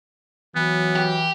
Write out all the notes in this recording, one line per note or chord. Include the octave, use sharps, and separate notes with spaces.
E3 F#3 B3
G4